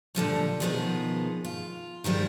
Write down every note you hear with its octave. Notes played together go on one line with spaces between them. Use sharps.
A#2 D3 F3 G3
B2 D#3 F3 G3 G#3 B3
F4
D#3 F3 G3 G#3